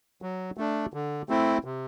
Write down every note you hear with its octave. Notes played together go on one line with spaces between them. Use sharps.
F#3
A3 D4
D3
A3 C4 E4
C3